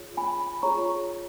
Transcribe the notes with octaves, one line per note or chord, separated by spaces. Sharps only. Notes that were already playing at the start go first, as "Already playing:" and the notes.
Already playing: F4 G#4 C#5
G#5 B5
F4 G#4 C#5 A#5 C#6